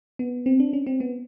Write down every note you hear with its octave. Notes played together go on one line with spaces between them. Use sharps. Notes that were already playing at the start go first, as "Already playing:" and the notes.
B3
C4
D4
C#4
C4
B3